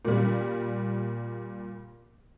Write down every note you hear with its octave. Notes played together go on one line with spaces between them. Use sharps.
A#2 G3